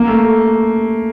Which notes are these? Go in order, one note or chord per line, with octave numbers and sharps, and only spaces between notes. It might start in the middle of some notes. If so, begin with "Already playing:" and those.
Already playing: A#3
A3